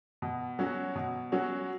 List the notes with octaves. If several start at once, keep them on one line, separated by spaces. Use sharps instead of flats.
B2
F#3 C#4 F#4
B2
F#3 C#4 F#4